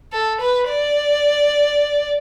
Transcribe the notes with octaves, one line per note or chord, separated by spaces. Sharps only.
A4
B4
D5